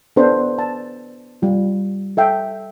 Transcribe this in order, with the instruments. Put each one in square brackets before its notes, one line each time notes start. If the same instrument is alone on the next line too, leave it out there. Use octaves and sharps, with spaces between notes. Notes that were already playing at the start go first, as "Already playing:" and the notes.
[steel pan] B3 D4 A4 B4 C5
A5
G3 F4
A4 E5 G5